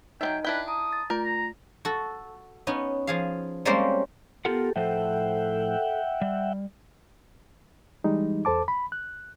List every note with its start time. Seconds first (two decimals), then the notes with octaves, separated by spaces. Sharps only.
0.21 F#3 C4 D#4 D#5 E5 G5 A#5
0.45 D4 E4 B4 G5
0.68 A5 A#5 D#6
0.93 A6
1.10 A3 F4 A#4
1.24 A#5
1.85 F#4 A4
2.67 B3 C#4 D#4
3.07 F3 G#4 F5
3.65 G3 G#3 A#3 C4 C#4 C5
4.45 B3 F4 G4 A4 A#4 F#5
4.76 A2 F3 A4 C5 E5 F#5 G5
6.21 G3
8.04 E3 G3 G#3 D#4
8.45 E2 A4 C5 A5 D6
8.68 B5
8.92 F#6